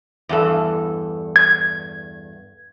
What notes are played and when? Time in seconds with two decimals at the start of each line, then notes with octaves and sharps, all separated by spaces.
0.29 E2 G2 A4
1.36 G#6